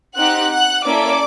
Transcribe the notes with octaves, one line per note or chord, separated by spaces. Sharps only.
C4 D#4 G4 F#5 F#6
F#5 F#6
A#3 C#4 E4 A4 D5 D6